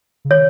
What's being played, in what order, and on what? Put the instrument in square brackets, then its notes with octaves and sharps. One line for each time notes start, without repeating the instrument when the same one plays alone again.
[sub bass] C#3
[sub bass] D#3 [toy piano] C#5